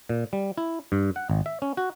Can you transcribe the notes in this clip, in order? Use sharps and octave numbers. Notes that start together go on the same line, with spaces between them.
A#2
G3
E4
G2
F#5
G#1
E5
C#4
F#4